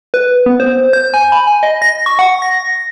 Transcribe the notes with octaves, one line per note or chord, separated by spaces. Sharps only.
B4
B3
C5
G6
G#5
B5
G#5
D#5
A#6
C#6
F#5
A#6